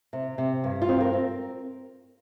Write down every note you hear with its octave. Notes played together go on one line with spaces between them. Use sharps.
C3
C3
G2
F4
C4
A#4
C4